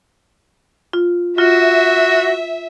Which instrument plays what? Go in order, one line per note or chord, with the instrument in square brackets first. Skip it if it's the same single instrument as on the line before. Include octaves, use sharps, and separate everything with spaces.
[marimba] F4
[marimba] F4 [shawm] F#4 [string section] E5